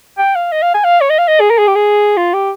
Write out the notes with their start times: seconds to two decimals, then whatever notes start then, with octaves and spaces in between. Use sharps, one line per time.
0.18 G5
0.36 F5
0.52 D#5
0.62 F5
0.74 G#5
0.85 F5
1.01 C#5
1.10 D#5
1.18 F5
1.28 D#5
1.40 G#4
1.51 A#4
1.59 G#4
1.68 G4
1.75 G#4
2.17 F4
2.34 G4